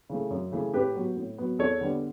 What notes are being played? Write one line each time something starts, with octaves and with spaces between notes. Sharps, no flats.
C#3 E3 A3
F#2
C#3 E3 A3
A2 G4 B4
F#3 B3
A2
F#3 B3
E2 A4 C#5
D3 G3 B3